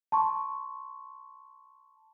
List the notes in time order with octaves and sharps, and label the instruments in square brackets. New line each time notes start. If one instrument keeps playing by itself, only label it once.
[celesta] A5 C6 C#6